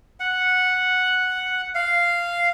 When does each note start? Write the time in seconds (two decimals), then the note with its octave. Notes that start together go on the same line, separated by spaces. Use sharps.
0.20 F#5
1.75 F5